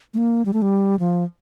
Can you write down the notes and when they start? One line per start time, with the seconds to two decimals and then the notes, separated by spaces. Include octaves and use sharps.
0.14 A3
0.18 A#3
0.46 G3
0.53 A3
0.62 G3
0.99 F3